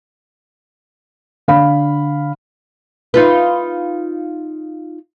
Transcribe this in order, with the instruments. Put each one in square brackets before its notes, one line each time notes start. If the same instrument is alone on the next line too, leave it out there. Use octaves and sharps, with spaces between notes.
[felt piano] D3 F5 B5
[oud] D#4 F4 B4